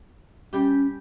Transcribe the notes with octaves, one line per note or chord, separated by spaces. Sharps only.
G3 C#4 G4